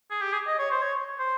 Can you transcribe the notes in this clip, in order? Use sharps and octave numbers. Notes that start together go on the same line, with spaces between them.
G#4
G4
G#4
D#5
C#5
C5
C#5
C5